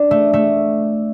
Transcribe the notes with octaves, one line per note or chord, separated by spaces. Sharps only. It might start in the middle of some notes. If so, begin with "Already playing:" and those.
Already playing: D4
A3
A3